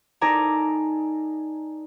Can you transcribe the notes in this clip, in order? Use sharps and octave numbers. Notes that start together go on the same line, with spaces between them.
D#4 A4 D5 G#5 A#5